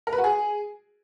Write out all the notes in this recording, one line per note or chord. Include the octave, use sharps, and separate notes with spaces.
A#4
B4
F#4
G#4